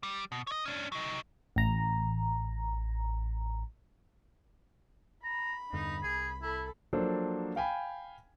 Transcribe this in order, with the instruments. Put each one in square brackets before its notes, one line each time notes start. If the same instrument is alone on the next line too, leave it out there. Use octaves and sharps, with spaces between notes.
[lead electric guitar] G3
B2
C#5 D#5
C#4 D4
F#3 D#4
[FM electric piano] A1 A#5
[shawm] A#5 [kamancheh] B5
[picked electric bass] E2 G2 D3 [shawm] D#4
[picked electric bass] C2 [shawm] G#4
[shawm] E4 [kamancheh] A4 B5
[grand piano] F3 F#3 A#3 D4 A4 C5
F5 G5 G#5 B5